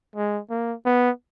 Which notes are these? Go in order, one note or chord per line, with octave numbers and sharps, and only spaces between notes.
G#3
A#3
B3